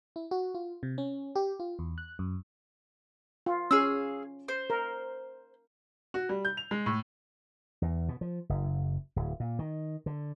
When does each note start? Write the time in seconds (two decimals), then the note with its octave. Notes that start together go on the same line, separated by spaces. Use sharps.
0.16 E4
0.31 F#4
0.55 F4
0.83 C3
0.98 C#4
1.36 G4
1.60 F4
1.79 E2
1.98 F#6
2.19 F#2
3.46 F4
3.71 C#4 G#4 F5 E6
4.48 C5
4.70 A#4
6.14 F#4
6.29 G3
6.45 G6
6.57 F7
6.71 G#3
6.86 A2
7.82 E2
8.09 B2
8.21 F3
8.49 F#1
9.16 D1
9.40 A#2
9.59 D#3
10.06 D3